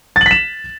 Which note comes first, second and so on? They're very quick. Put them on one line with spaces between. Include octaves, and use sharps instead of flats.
A6 F#7 B6 E7